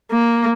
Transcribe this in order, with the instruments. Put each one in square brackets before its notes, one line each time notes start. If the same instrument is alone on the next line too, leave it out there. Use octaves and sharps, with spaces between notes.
[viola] A#3